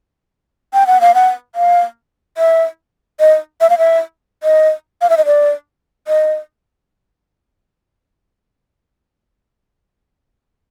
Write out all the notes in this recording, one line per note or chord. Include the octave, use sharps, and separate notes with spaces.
G5
F#5
F5
F#5
F5
E5
D#5
E5
F5
E5
D#5
F5
E5
D#5
D5
D#5